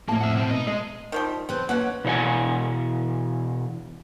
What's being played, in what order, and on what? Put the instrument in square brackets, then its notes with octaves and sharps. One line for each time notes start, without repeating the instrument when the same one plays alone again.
[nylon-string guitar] F2 A2 A5 [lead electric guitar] A#3
[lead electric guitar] E5 F#5
B2 C4
[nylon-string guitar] B2 [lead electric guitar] D#4 D#5
[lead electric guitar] G#3 [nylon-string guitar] D#5
[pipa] D#3 F3 G3
[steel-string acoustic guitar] E2 B4 A5 [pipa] C4
[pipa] B2 F#5 [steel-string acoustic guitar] A#3 C#4 B4
[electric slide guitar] B2 E3 C#5 F#5 G#5